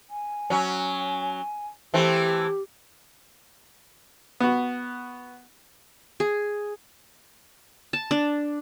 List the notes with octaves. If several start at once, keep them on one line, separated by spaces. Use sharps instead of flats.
G#5
F#3 C#4
E3 A3 C4 G4
B3 F#4
G#4
A5
D4